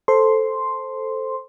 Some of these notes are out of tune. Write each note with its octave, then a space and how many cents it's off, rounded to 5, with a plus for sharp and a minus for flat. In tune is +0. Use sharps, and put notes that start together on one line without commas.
A4 +0 C5 +5 C6 +0